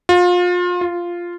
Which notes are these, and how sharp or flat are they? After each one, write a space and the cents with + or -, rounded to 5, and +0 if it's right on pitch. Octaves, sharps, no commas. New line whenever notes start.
F4 +30
F4 -5